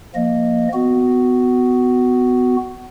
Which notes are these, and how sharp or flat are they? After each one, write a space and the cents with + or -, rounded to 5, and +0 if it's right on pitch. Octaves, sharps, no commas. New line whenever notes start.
F3 -10 A#3 +0 D#5 -15
B3 +25 F#4 +0